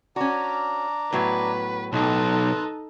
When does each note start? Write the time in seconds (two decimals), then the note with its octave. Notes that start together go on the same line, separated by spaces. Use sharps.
0.16 C#4 D4 F#4 D5 A#5
1.13 A2 F#3 B3 B4
1.93 B1 D#4 A4 B4 A5 C6